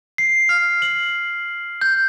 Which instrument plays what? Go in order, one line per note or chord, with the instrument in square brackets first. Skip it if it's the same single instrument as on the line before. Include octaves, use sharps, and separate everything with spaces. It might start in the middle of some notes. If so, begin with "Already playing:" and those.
[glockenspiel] C7
F6
F#7
G6